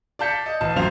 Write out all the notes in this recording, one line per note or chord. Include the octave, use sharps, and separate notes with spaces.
D5 F5 A5 G6 B6 C#7
D#5
A1 A5
D1 F#2 C5 F5 F7